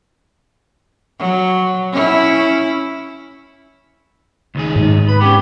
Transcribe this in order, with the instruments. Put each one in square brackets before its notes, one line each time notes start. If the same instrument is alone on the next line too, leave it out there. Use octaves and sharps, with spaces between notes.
[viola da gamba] F#3
C#4 E4
[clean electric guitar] C#2 D#3 G#4
[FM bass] G#2
[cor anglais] B4 [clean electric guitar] B5
[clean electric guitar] B3 C#4 [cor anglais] G4